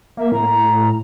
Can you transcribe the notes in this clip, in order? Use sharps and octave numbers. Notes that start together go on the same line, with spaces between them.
A#3 E5
A2 A#5